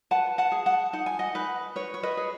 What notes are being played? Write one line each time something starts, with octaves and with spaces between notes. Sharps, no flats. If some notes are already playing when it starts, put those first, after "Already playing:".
B4 F#5 A5
F#5 A5
G#4
F#5 A5
D#4 F#5
G#5
D#5 F#5
D#4 B4
B4 C#5
C#5
B4 D#5
G#4